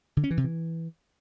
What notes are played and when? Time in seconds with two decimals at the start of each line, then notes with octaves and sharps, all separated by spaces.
0.17 D3
0.24 C#4
0.31 E3
0.37 C3
0.44 E3